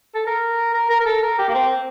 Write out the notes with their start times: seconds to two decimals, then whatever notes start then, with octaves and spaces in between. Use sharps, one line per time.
0.15 A4
0.27 A#4
0.74 A#4
0.90 A#4
1.00 A#4
1.06 A4
1.23 A#4
1.39 G4
1.48 A#3
1.54 C4